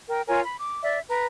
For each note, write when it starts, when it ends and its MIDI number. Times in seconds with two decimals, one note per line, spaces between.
0.08 0.21 70
0.08 0.21 79
0.27 0.40 65
0.27 0.40 70
0.27 0.40 73
0.27 0.40 80
0.43 0.57 83
0.58 0.81 86
0.83 0.99 74
0.83 0.99 76
1.08 1.25 71
1.08 1.25 82